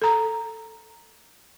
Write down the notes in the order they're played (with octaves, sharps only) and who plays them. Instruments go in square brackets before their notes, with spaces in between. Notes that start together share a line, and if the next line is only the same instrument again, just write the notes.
[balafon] A4 A#5